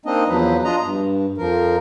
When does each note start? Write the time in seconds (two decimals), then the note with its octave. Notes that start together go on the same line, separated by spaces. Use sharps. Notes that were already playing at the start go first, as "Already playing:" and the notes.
0.06 A#3 C4 D4 D#4 D#5
0.28 E2 F3 F#3 B4
0.64 D4 F4 D#5 A#5
0.81 G2
1.38 F2 F3 A#4